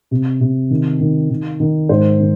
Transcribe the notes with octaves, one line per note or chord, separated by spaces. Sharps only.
C3
C3
D#3
D#3
D#3
D#3
G#2 C5
D#3